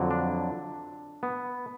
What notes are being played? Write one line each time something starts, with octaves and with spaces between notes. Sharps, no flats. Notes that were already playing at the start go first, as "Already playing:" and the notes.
Already playing: F2 D3 F#3
D4
B3